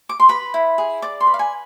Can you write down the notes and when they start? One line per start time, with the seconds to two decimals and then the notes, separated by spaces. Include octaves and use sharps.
0.09 D6
0.20 C6
0.29 B4 B5
0.54 E4
0.78 G#4
1.02 D5 D6
1.20 C6
1.27 B4
1.34 F5
1.39 G#5